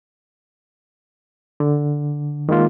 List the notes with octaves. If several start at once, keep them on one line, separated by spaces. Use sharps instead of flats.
D3
D#3 G#3 A#3 F4